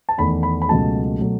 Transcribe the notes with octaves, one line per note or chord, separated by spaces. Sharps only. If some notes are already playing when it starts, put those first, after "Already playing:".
A5
E2 D#3 A3 D#4 B5
B5
B5
C#2 B2 F#3 A3 A5
B2 F#3 A3